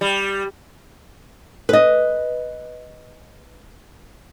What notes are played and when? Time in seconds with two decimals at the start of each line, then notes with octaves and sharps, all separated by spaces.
0.01 G3
1.69 B4 D#5